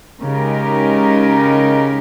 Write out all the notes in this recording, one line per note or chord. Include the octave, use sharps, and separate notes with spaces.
C#3 G#3 D#4 G4 A#4